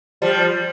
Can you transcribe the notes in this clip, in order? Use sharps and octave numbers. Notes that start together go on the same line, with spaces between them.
F3 G3